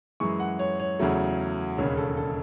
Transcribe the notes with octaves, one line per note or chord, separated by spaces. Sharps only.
F#2 E3 G#3 C#6
F#5
C#5
C#5
E2 C#3 F#3 A3
E1 D#2 C#3 C#5
A4
A4